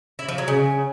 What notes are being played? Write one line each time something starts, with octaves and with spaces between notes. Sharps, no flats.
E4
F3
F#3
C#3